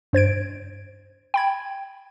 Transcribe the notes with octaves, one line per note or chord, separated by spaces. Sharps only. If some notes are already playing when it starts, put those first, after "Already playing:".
G2 C5 G#6 D7
G5 B5 G#6